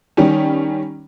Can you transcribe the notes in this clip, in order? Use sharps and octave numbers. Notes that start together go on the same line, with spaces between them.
D#3 G3 C#4